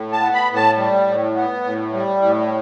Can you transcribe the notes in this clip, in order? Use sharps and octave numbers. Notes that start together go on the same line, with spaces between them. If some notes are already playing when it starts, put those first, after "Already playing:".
Already playing: A2
A5
B3
B5
A2
A5
G3
A2
B3
A2
G3
A2